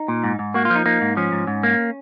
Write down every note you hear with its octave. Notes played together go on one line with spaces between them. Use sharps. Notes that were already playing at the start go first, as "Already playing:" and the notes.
Already playing: D#4
A#2
G#2
G#2
A#3 F#4
F4
F3
D#4
A#3 D#4
G#2
F3 C#4
G#2
G#2
A#3